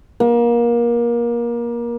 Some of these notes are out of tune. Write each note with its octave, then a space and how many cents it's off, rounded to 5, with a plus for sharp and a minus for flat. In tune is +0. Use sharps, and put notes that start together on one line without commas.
A#3 +25